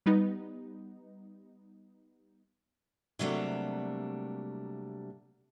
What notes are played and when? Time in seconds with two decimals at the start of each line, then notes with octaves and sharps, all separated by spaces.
0.06 G3 B3 D#4
3.19 C3 F#3 G3 A3 A#3 D4